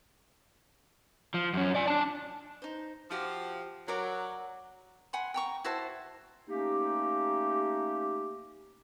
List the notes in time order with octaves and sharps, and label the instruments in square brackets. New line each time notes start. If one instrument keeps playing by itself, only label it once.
[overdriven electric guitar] F3
F#2 C#4
D5 G#5
D4 A5
[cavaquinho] D#4 C5
[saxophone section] F3 [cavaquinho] F#4 G4 F5
[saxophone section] F#3 [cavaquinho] A#4 D5 F#5
[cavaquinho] F#5 G#5 B5 C6
G5 A#5 C#6
E4 F#4 C5 A5
[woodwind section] A3 A#3 C#4 D#4 G4